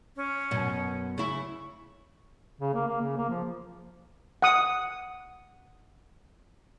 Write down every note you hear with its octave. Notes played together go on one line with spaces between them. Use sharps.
C#4
F#2 B2
C#3 E4 C#6
C#3
A#3
A#3
C#3
A#3
F3
F#5 D#6